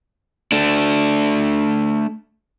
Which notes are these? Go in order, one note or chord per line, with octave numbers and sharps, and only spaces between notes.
A3 D4